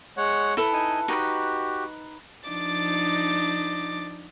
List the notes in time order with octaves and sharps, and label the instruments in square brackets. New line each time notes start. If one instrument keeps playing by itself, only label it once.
[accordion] G#3 C#5 F#5
[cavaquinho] E4 A4 B4
[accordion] D#4 G#5
[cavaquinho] D#4 B4 B5 [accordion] F#4 G4
[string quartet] F3 D4 D#4 D6 A6